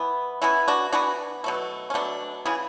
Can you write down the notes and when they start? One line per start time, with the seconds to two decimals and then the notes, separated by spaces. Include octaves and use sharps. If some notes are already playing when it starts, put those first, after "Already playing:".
Already playing: E3 B3
0.42 E3 B3 C#4 E4
0.68 D4 F#4
0.92 E3 B3 D4 F#4
1.44 B2 F#3 A3
1.90 C#4
1.94 B2 F#3 A3 D4
2.45 C#3 E3 B3 E4 G#4